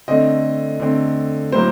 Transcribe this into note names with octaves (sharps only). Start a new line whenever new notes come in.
D3 A3 C4 D#5
D3 A3 C4
A2 F#3 A#3 C5